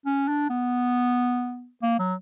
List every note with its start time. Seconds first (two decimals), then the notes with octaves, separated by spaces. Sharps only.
0.06 C#4
0.28 D4
0.49 B3
1.82 A#3
1.99 F#3